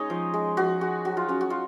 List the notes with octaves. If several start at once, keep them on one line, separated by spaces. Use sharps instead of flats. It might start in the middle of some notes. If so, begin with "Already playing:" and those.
Already playing: G#3 C#4 D#4 C#5 D#5
F3
G#3
F3 F#4
G#3 F#4
F#3 F#4
F4
C#4 F#4
F#4
F4